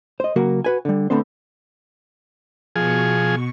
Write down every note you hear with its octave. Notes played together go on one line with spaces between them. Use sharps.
C5 D#5
C#3 F#3 A#3 F#4 A#4
F#4 B4 G#5
D3 G3
D3 A3 B3 C4 C5
B2 F3 G#4 C#6